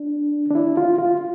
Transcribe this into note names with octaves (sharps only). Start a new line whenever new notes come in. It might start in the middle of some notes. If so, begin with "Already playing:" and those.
Already playing: D4
D4
E4
F4
F4